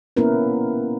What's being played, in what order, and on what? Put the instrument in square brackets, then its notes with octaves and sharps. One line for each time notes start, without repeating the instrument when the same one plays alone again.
[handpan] A#3 B3 C#4 E4 A#4 B4